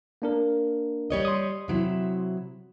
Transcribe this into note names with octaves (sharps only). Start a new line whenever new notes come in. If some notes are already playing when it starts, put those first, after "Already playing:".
A#3 D4 A#4
G3 C#5 D#5
C6 D#6
C3 F#3 E4